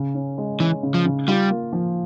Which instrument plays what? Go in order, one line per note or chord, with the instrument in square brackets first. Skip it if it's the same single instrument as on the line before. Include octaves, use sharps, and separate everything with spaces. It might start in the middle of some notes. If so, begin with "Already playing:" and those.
Already playing: [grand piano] C#3
C#4
G#3
[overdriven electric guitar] E3 [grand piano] C#4
[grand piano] C#3
[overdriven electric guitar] F3
[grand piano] C#3
[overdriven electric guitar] G3 [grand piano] F4
[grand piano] A#3
F3